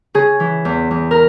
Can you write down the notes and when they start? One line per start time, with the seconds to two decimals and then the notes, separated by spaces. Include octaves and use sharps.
0.14 C#3 G#4
0.40 E3
0.65 E2
0.91 E2
1.11 A#4